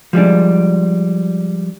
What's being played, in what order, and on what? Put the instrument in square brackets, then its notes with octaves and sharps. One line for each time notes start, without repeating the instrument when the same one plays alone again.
[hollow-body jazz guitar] F3 G3 G#3 D4